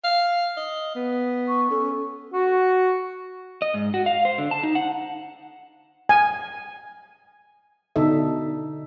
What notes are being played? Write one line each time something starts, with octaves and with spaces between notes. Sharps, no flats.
F5
D#5
B3
C#6
C#4 A4
F#4
D#5
G#2
F#4
F5
C5
D3
A5
D#4
F#5
G#5
B2 D3 D4 D#4 A4 E5